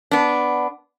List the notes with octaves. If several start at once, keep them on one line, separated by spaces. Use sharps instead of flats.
B3 D4